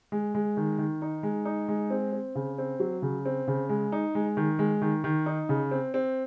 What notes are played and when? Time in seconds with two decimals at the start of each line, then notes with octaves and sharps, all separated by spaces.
0.12 G#3
0.35 G#3
0.57 D#3
0.78 D#3
1.02 D#4
1.23 G#3
1.45 D#4
1.68 G#3
1.90 C4
2.12 C4
2.35 C#3
2.58 C4
2.80 F#3
3.02 C#3
3.26 C4
3.47 C#3
3.69 G#3
3.92 D#4
4.15 G#3
4.37 D#3
4.59 G#3
4.82 D#3
5.04 D#3
5.26 D#4
5.49 C#3
5.71 C4
5.94 C4